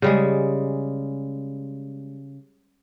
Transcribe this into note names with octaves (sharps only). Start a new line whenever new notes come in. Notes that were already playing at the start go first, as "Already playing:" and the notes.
C#3 G3 G#3